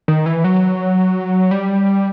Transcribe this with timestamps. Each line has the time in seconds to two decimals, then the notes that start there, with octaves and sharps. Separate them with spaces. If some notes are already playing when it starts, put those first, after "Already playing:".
0.08 D#3
0.26 E3
0.44 F#3
1.51 G3